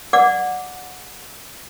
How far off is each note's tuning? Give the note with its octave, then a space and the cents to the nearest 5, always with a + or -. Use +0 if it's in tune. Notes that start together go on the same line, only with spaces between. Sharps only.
D5 +0 F#5 -15 D6 -5